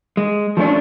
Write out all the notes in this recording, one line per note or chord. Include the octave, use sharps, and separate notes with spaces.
G#3
F3 A3 C#4 D4